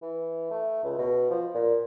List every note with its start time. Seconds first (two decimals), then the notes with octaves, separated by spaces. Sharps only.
0.02 E3
0.51 A3
0.84 C#2
0.98 B2
1.30 F3
1.55 A#2